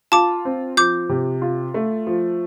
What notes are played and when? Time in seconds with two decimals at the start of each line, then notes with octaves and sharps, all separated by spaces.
0.12 F4 A5 D6
0.45 C4
0.77 F3 D6 G6
1.09 C3
1.42 F4
1.74 A3
2.07 F3